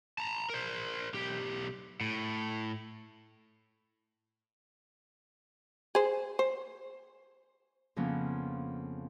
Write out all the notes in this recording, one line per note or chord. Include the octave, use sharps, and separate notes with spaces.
A5 A#5
A#4 C5
B1 G4
A2
G#4 C5
C5
F2 C#3 F3 A#3 B3 C#4